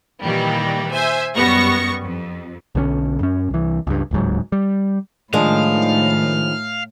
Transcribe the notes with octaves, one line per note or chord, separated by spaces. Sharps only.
A#2 D#3 E3 G3 A#3
C5 E5 G#5
F#2 G3 B3 C#6 A#6
F2
B1 D3 G3 C#4
F#2 C#4
C2 E3
C#2 G2
D1 C#2 G#2 F#3
G3
A2 D#3 F3 G#3 D4 F5